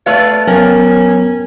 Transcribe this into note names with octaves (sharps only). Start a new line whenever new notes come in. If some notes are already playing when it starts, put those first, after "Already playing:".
A3 B4 D5 F5
F#3 B3 C#4 A#4 G5